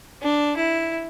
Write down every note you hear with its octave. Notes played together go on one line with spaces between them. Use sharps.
D4
E4